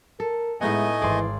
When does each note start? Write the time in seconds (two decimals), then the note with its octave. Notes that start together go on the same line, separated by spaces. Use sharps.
0.20 A4 A#4
0.61 A2 G#3 A3 B3 D#4 D#5 F#5 G#5
1.02 G#1 E3 G#4 D5 C6